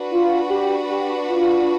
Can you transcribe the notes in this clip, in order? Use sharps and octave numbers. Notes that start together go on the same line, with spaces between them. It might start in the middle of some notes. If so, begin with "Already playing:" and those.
Already playing: D4 F#4 B4
F4
G4
G4
F4